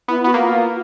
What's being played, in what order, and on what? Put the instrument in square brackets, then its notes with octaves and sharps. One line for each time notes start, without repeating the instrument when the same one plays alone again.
[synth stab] B3 [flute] E4
[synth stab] B3 [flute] F#4
[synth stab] A#3
[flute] F4